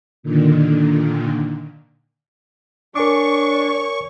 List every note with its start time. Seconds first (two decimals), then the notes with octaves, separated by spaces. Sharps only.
0.23 A#2 D3 D#3
2.95 D4 A#4 C#5 G#5 C#6 D6